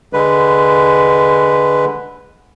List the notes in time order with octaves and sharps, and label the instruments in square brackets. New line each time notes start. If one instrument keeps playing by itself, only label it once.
[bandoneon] D3 G#3 B4